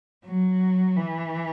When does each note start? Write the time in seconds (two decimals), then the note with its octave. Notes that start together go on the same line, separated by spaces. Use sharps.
0.25 F#3
0.97 E3